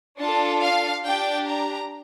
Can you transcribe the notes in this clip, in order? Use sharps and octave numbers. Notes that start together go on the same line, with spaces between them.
D4 F4 A4 A5
F5
D4 G4 G5
A#5